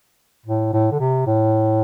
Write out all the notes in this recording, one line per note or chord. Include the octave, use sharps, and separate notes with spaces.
A2
A2
D3
C3
A2